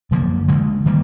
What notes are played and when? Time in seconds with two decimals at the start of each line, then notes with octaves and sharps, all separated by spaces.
0.11 F#2 D3 F3 A#3
0.48 D2 D3 F3 G#3
0.86 D#3 G3 A#3